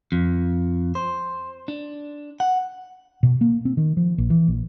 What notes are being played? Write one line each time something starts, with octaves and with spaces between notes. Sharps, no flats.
F2
C5
D4
F#5
B2
A#3
C4
D#3
F3
A#1
E3
A#1